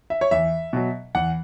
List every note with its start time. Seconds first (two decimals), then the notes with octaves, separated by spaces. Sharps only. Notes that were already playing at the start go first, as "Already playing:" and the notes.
0.10 E5
0.21 C#5
0.31 E2 E5
0.73 B2 F#3
1.15 E2 F#5